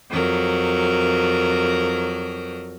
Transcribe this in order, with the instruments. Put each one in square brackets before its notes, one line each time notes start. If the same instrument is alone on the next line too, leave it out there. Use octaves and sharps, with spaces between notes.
[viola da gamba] F2 F#3 A#4